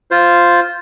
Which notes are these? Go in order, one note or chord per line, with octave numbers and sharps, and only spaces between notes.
F4 C5